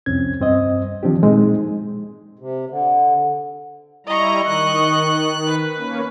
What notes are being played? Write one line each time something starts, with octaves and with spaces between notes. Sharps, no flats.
C2 F2 C4 C#4 G#6
G2 C4 D#5
D#3 F3 C4 D4 G4
A#2 G#3 C4 D#4
C3
D3
G3 E4 D#5 A#5 C#6
D#3 F#6
B4
A#3 C#4